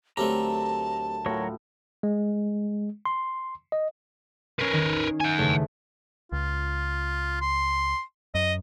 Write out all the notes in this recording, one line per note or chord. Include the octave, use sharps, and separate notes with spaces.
D2 F#3 A3 C4 G4 A#4 A5 A#5
A2 F#3 F4 F#4 A#4 C#5
G#3
C6
D#5
C#4 A#4 B4 G#6 C7
D#3
F#5 G#5
E2 C#3 A3
C#2 F4
C6
F#2 D#5